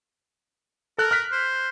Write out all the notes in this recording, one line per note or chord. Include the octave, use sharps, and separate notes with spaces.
A4 A#4 F#6
F6 F#6 B6
C5